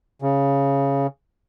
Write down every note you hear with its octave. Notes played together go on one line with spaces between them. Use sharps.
C#3